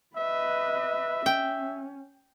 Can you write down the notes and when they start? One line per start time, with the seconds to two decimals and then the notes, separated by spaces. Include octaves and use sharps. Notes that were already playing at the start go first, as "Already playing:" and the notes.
0.17 B4 D#5 E5
1.26 C#4 G5